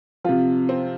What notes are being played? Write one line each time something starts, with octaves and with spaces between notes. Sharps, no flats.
C3 F3 F4
C4